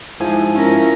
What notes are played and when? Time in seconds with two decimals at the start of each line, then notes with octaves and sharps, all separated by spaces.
0.20 G#2 F3 E4 G#5
0.55 C#4 E4 F4 A#4